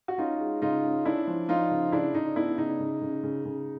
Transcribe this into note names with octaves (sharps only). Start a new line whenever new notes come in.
F#4
C#4 D#4 F4
G#3
C#3 D#4 F4
C#4
C#4 D4 E4
F3
F3 D#4 F4
C#3
C#3 D4 E4
C#3 D#4
B3 D4 E4
C#3 D#4
C#3
C#3
C#3
C#3